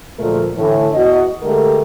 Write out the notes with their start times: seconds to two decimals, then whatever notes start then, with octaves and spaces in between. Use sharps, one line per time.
0.19 D2 A#2 F3 G#3 A3 A#4
0.57 A2 D3 E3
0.94 E2 F#4 D#5
1.43 D3 G#3 A3 G4 A#4